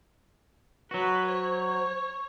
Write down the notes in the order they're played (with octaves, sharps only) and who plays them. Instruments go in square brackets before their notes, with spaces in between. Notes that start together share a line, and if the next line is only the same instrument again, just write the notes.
[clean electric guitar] F#3 F#4 [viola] B4
[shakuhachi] C5 [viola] C#5